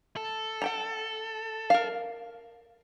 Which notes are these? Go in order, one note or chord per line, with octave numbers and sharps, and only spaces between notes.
A4
F#5 G5 A#5
A#4 F5